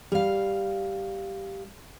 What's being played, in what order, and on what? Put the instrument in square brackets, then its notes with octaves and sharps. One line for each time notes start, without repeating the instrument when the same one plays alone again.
[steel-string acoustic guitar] G3 F5